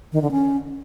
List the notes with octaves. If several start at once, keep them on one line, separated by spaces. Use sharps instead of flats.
D#3
D3
C#4